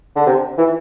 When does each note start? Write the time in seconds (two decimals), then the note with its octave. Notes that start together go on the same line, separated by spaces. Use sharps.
0.16 D3
0.26 C3
0.58 E3